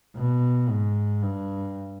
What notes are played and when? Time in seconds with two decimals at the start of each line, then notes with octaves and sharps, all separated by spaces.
0.16 B2
0.69 G#2
1.22 G2